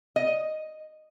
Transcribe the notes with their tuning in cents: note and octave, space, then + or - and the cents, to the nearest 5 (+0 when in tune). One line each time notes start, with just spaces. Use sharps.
D#5 +0